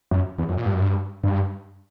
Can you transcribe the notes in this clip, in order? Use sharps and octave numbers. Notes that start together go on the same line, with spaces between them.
F#2
E2
F#2
A#2
G2
F#2
G2
G2